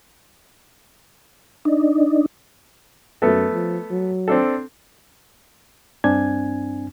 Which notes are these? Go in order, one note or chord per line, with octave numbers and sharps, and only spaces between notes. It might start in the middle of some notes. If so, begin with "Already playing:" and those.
D4 D#4
F#2 A3 B3 A4
F3
F#3
C4 D4 A4
G2 C4 D4 G#5 G#6